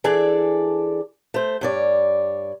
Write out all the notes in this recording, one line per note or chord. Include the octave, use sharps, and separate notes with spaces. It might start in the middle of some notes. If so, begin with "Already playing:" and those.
E3 D4 G#4 A4 D5
A3 C5
G2 C#5 D5